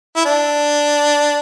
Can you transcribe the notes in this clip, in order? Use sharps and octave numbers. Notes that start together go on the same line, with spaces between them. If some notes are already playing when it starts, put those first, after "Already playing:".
E4
D4